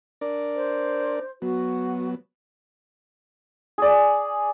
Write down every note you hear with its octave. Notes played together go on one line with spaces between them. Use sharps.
D4 A#4 D5
C5
F#3 B3 F#4
G#4 D5